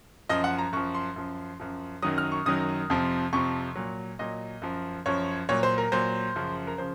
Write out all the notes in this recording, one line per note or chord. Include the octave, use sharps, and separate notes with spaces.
F#2 F3 D#5
F#5
A#5
F#2 F3 C#6
C6
F#2 F3
F#2 F3
F#2 D#3 F#3 D#6
F6
C#6
F#2 D#3 F#3 D#6
F2 C3 F3
F2 C3 F3 C#6
A#2 F#3
A#2 F#3 D#5
F#2 F3
F#2 F3 C#5
A#2 F#3 C#5
C5
A#4
A#2 F#3 C5
F#2 C#3 F3
A#4
C#3 F3 C5